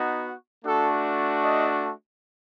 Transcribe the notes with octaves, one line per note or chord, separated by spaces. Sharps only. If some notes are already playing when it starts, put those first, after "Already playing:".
Already playing: B3 D#4 F#4
A3 D4 F#4 A4
D#5